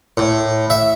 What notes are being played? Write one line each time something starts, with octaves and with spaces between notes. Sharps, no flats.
A2
E5